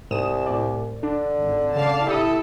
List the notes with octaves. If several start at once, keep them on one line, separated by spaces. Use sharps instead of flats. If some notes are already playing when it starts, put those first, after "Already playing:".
C2 G#2 D#6 E7
A2 D5
D3 D4
G#1
C#3 D5 F5 A5
E4 G4 A4 D#6